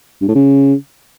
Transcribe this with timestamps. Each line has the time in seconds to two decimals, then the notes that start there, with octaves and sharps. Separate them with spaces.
0.21 G2
0.28 A2
0.35 C#3